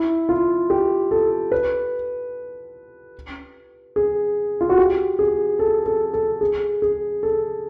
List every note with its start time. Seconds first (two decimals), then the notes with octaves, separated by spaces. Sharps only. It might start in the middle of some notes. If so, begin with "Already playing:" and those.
Already playing: E4
0.29 F4
0.70 G4
1.11 A4
1.52 B4
3.96 G#4
4.61 F4
4.69 F#4
4.78 G4
5.19 G#4
5.59 A4
5.86 A4
6.14 A4
6.41 G#4
6.82 G#4
7.23 A4